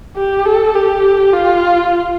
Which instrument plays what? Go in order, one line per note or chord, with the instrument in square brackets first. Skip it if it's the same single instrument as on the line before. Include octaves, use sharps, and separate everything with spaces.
[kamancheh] G4
A4
G4
F4